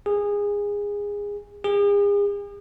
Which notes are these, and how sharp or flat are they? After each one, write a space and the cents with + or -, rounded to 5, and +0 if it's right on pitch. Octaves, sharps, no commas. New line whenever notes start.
G#4 -20
G#4 -40